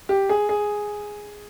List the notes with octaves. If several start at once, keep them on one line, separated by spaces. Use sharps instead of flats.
G4
G#4
G#4